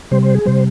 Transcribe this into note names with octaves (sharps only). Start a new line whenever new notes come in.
C3 G3 C5
C5
G#4
C3 G3 C5